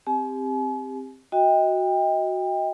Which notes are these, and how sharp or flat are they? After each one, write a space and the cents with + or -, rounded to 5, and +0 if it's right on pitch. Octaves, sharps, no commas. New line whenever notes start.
C4 +0 G4 +25 G#5 +45
F#4 +0 D#5 +30 G5 +25